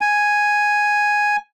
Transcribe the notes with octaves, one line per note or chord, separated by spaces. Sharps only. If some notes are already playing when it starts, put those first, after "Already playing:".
G#5